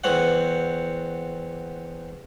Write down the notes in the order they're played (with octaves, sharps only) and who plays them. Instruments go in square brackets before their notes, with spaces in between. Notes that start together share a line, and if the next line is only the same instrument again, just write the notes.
[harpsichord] E2 C4 C#5 F#5